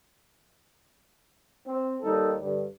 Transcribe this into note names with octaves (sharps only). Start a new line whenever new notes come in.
C4
D#2 G3 D#4 A4
G2 D3 G3